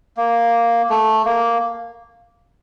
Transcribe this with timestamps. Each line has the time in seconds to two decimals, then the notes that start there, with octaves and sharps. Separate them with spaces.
0.17 A#3
0.90 A3
1.25 A#3